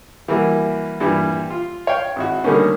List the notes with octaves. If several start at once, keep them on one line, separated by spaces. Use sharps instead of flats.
E3 G3 A#3 E4 F#4
G2 A#2 E3 G3
F4
C#5 F5 G5
G#1 E4 F#4
D3 D#3 G3 A3 A#3 C#4